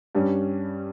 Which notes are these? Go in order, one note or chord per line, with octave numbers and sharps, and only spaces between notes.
G2 G3 C#4